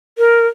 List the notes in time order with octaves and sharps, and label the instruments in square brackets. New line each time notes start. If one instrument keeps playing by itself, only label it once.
[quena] A#4